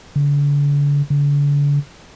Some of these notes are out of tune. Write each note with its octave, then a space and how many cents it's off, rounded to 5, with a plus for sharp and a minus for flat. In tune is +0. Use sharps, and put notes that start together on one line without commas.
D3 -40
D3 -40